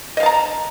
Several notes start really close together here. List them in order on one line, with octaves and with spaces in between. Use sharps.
D#5 F5 A5 A#5